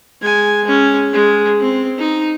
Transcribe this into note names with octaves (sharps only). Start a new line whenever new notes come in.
G#3 G#5
G#3 C#4
G#3
C4
D#4